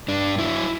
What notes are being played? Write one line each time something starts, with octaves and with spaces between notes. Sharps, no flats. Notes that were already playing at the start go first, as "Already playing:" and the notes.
G2 D4
F#3 E4